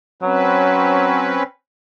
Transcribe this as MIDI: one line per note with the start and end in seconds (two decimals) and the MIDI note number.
0.22 1.40 54
0.22 1.43 60
0.22 1.43 61
0.22 1.43 71